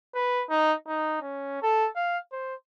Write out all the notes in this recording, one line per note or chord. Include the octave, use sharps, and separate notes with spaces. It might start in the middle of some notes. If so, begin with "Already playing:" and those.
B4
D#4
D#4
C#4
A4
F5
C5